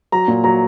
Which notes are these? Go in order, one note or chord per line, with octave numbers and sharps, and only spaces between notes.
F#3 A#5
A#2
F#3 A#5